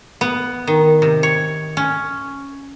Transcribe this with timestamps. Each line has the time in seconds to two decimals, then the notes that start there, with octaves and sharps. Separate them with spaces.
0.21 B3
0.67 D#3
1.02 C3
1.23 C#5
1.77 C#4